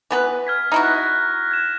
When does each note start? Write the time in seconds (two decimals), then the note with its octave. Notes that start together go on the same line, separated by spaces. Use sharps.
0.11 E3 B3 B4
0.47 F6 G#6 B6
0.72 D#4 E4 F#4
0.83 F#6 A#6
1.51 G#6 E7